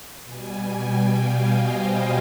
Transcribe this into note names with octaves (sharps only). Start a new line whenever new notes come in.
B2 G3 G#5
G5
F5
D#5
C5